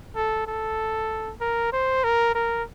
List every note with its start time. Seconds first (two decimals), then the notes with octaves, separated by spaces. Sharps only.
0.16 A4
0.47 A4
1.41 A#4
1.73 C5
2.04 A#4
2.35 A#4